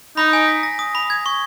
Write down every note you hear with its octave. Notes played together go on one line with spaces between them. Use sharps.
D#4 B5
G#5
B6
A#6
D#6
B5
G#6
C#6